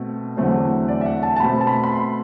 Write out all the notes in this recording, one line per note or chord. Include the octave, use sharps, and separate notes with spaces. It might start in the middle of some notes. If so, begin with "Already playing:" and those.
Already playing: B2 A3 C4
E2 D3 F#3 A3 C4
D5
E5
F#5
A5
A5
B2 A3 C4 B5
A5
B5
B5
C6